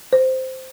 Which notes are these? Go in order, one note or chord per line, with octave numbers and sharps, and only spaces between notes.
C5